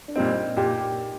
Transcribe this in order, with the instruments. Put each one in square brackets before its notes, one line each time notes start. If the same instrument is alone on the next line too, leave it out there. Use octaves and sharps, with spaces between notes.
[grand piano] D4
[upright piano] A#2 G3 C4 [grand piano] D#4
[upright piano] A#2 [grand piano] G4